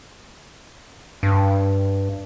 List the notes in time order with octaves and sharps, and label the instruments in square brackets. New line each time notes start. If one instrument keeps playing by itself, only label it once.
[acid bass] G2